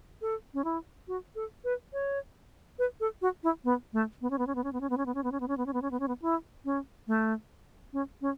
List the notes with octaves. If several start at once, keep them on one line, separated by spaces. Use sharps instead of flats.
A4
C#4
E4
F#4
A4
B4
C#5
B4
A4
F#4
E4
B3
A3
B3
C#4
B3
C#4
B3
C#4
B3
C#4
B3
C#4
B3
C#4
B3
C#4
B3
C#4
B3
C#4
B3
C#4
B3
C#4
B3
E4
C#4
A3
C#4
C#4